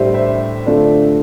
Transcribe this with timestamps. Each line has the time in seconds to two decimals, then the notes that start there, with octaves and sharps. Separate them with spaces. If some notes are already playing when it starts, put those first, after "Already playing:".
Already playing: A2 G3 D4 G4 C5 E5
0.14 C5 E5
0.66 D3 A3 D4 F4